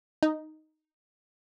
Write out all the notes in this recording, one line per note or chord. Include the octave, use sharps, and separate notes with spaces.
D#4